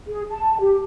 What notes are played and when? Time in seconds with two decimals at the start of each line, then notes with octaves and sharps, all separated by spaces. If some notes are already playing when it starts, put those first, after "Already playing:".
0.08 G#4
0.30 A5
0.60 G4